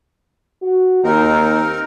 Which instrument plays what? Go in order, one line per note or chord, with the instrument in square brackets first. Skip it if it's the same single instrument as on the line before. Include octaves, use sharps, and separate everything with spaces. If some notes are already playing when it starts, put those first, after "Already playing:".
[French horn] F#4
[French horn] D#2 [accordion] C4 D#4 A#4